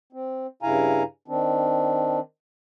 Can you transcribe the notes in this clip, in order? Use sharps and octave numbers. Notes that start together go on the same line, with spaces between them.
C4
G2 C#3 E4 F5 G#5 A#5
D#3 C4 D4